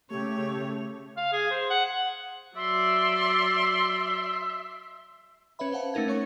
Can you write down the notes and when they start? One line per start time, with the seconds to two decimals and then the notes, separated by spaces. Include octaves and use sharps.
0.11 C#3 A3 G4 C#5
1.17 F5
1.32 G#4
1.51 C5
1.70 F#5
2.57 F#3 D5 E5 C6
5.59 C#4 B4 C#5 E5 B5
5.72 C5 F5 F#5 A5
5.94 A3 C#4 D#4 A#4 G#6
6.08 C#4 C#5 C#6